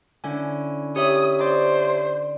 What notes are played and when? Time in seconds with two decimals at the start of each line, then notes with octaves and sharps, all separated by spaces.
0.24 D3 C#4 E4 G#5
0.96 G4 C#5 E5 D#6
1.40 C5 D5